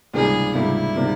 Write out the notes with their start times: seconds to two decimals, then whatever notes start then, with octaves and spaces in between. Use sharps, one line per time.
0.14 C#2 C3 D#3 G3 A#3 G#4
0.55 C#2 C3 D#3 G3 A#3 E4
0.96 C3 D#3 G3 A#3